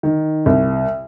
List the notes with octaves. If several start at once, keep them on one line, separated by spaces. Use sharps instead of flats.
D#3
C2